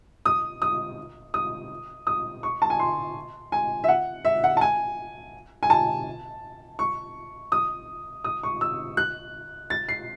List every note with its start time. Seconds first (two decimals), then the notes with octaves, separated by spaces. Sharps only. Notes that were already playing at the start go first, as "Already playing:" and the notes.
0.26 D#6
0.62 D#6
1.34 D#6
2.07 D#6
2.43 C#6
2.62 A5
2.70 G#5
2.79 C6
3.52 G#5
3.84 E5
3.88 F#5
4.25 E5
4.44 F#5
4.57 A5
4.61 G#5
5.63 G#5
5.70 A5
6.79 C#6
7.52 D#6
8.24 D#6
8.43 C#6
8.61 E6
8.97 F#6
9.70 A6
9.89 C7